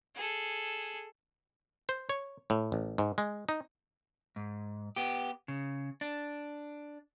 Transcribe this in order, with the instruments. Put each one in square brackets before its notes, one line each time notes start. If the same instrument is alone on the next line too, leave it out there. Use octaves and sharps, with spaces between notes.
[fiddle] G#4 A4
[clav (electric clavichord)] C5
C#5
A2
A1
G#2
G#3
D#4
[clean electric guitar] G#2
B3 G4
C#3
D4